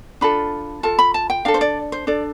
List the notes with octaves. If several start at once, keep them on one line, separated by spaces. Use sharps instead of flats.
D4 F4 A4 B5
F4 A4 A5
B5
A5
G5
D4 A4 F5
C5
D5
C5
D4 A4 D5